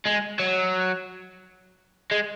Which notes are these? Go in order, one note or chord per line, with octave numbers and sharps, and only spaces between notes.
G#3
F#3
G#3